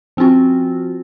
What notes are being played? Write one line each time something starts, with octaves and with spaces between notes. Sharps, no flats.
F3 C4 C#4 F4 F#4